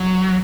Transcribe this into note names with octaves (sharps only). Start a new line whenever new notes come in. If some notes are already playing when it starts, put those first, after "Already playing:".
Already playing: F#3